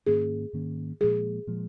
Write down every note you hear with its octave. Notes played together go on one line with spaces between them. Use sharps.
G#2 D#3 A#3 C#4 G#4
G#2 D#3 A#3 C#4
A#2 F3 G#3 G#4
A#2 F3 G#3